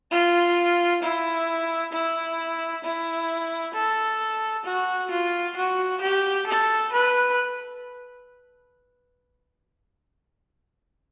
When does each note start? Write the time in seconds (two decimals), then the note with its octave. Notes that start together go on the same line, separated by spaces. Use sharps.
0.11 F4
1.02 E4
1.93 E4
2.84 E4
3.74 A4
4.65 F#4
5.10 F4
5.56 F#4
6.01 G4
6.47 A4
6.92 B4